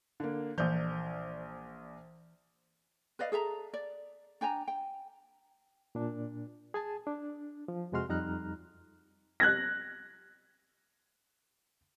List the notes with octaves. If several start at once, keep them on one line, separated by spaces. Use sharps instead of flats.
D3 A#3
A#1 E3 C5 D5 G6
B4 D5 D#5 F5
G#4 A4 E5 A#5
D5
D4 G5 G#5 A#5
G5
A#2 D4
G#4 G#5 A5
D4
F3
F2 C3 G#3 F#4 C6 F6
F2 G3 D#4 A#5 F6 F#6
F#6 G#6 A#6